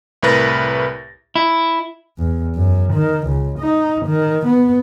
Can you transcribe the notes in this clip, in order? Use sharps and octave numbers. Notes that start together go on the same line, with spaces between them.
C2 A2 A#4 B4 A6 A#6
E4
E2
F#2
D#3
C#2
D#4
D#3
B3